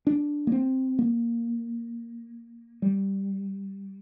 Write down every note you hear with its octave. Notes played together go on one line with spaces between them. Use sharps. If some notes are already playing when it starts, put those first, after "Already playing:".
D4
A#3
C4
A#3
G3